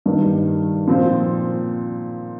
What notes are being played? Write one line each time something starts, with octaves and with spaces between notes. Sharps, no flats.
G2 D#3 G3
A#2 F3 C4